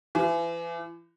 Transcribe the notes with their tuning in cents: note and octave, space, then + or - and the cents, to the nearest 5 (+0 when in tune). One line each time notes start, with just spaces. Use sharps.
E3 +35